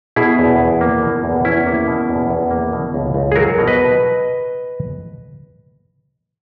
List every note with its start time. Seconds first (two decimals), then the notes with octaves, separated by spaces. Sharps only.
0.16 B2 E4 G#4
0.39 E2
0.60 E2
0.81 A#3
1.02 B2
1.24 E2
1.45 E2 C#4 E4
1.67 A#3
1.87 B2
2.09 E2
2.30 E2
2.51 A#3
2.73 B2
2.94 C#2
3.14 C#2
3.32 G#4
3.36 F#3 F#4 A#4
3.58 B2
3.68 B4 D#5